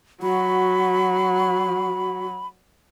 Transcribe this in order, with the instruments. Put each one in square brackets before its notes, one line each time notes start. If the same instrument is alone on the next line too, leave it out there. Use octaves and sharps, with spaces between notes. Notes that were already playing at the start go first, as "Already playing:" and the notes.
[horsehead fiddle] F#3 [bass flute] F#4 [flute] B5